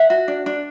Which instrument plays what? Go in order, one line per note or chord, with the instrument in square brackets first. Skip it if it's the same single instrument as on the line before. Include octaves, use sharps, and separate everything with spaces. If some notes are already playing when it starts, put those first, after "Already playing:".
Already playing: [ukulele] E5 F#5
F#4
D4
D4